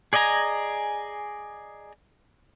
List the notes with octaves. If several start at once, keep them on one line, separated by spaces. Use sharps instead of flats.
G#4 D5 D#5 G#5 A#5